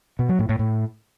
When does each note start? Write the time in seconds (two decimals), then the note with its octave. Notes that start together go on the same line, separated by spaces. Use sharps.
0.19 B2
0.29 F#3
0.39 A2
0.49 A2
0.59 A2